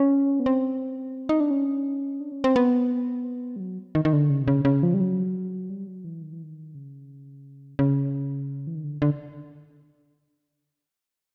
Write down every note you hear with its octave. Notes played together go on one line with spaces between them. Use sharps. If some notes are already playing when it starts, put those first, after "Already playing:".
Already playing: C#4
B3
C4
D#4
D4
C#4
D4
C#4
C4
B3
G3
F#3
D#3
D#3
D3
C#3
C3
C#3
C#3
F3
G3
F#3
G3
F#3
E3
D#3
E3
D#3
C#3
C#3
E3
D#3
D3
D3